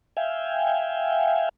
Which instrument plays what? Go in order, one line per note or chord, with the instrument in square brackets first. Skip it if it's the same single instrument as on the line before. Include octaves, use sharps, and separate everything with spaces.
[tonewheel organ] E5 F5 G5 G#5